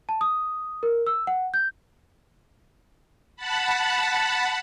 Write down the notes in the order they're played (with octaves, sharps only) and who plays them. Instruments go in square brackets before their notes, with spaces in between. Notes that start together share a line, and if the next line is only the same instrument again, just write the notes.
[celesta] A5
D#6
A#4
E6
F#5
G6
[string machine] F#5 A5 B5